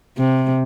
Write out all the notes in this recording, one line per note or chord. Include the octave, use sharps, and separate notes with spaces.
C3